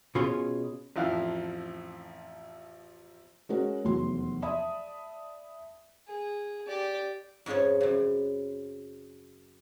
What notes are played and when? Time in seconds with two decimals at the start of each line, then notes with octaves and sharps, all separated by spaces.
0.15 B2 C#4 F4 G#4 C#5 C6
0.96 A1 F2 E4 F5
3.49 G#3 C#4 F#4 A#4
3.85 F1 E2 F#3 C6
4.42 D5 E5 A5 B5 D#6
6.08 G#4
6.68 G4 D5
7.46 F2 G#2 F3 C#4 C#5
7.81 F#2 C#3